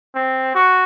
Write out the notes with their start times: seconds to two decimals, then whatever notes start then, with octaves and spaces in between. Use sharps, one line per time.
0.15 C4
0.55 F#4